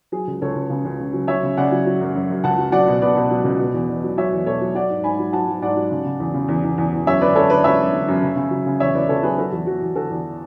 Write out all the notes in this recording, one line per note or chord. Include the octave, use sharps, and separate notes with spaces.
F#3 G#4
C#2
C#2 A4 C#5
C#2
C#3
C#2
C#3
F#3
F#3 C#5 E5
C#3
C#3 D5 F#5
F#3
F#3
F#2
F#2
F#2
C#2 F#5 A5
F#3
F#3 D5 F#5
B2
B2 B4 D5
B2
F#3
C#2
B2
E2
E2
F#3
F#3 C#5 E5
E2
B2 A4 C#5
F#3
F#3 D5 F#5
G#2
G#2 G#5 B5
F#3
F#3 F#5 A5
F#3
G#2 D5 F#5
F#3
C#3
C#3
E2
C#3
E2
E2
E2
E2
F#2 C#5 E5
D3 B4 D5
F#2 A4 C#5
D3 B4 D5
F#2 C#5 E5
F#2
D3
F#2
C#3
C#3
F#3
C#3
E2 C#5 E5
E2 B4 D5
C#3 A4 C#5
F#3 G#4 B4
F#3 F#4 A4
E2 F#4
F#3 F#4
E2
D3 F#4 A4
E2